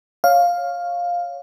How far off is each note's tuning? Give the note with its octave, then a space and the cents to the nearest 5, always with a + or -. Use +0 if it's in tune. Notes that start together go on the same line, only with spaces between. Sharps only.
C#5 +0 F5 +5